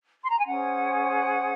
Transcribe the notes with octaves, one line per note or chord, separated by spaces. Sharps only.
C6
A#5
G#5
C#4 G#4 C5 F#5